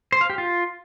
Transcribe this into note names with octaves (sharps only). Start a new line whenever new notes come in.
C5
F5
G4
F4